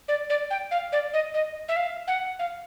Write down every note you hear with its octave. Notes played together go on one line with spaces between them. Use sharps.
D5
D5
G5
F5
D5
D#5
D#5
E5
F5
F#5
F5